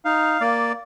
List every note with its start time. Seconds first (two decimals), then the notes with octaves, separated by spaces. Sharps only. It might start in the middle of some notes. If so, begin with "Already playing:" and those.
0.05 D#4 F5
0.41 A#3 D5